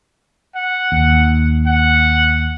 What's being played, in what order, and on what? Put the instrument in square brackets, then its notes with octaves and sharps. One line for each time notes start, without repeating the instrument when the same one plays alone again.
[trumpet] F#5
[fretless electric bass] D#2
[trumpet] F#5